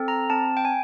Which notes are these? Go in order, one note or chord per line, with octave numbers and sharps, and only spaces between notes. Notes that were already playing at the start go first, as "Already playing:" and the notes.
Already playing: C4 A4
A#5
C4 A5
G5
G#5